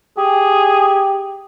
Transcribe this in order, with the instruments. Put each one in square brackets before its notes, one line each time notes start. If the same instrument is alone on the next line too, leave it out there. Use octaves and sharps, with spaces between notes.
[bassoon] G4 [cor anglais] G#4